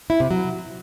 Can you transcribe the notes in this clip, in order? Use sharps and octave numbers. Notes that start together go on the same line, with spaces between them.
E4
C3
F#3